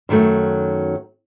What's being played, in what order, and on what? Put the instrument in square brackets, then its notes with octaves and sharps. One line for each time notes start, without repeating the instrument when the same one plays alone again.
[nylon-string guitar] F#2 D#3 F#3 A3